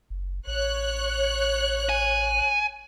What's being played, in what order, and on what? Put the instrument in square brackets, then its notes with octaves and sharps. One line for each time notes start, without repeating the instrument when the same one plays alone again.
[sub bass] F#1
[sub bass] A1 [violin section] C#5 F#6
[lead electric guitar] G#5